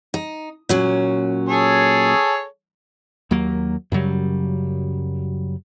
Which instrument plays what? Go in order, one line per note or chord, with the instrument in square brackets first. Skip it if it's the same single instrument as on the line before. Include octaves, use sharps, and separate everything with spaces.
[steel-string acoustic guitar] D#4
A#2 F#3 C#4
[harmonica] G#4 A4 C#5
[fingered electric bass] D#2 F#3 A#3
F#2 C#3 F#3 G3